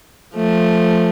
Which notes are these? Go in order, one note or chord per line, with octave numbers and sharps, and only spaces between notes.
F3 A3